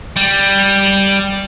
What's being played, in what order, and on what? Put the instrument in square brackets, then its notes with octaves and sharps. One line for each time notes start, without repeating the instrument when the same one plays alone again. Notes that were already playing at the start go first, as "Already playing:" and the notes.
[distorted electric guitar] G3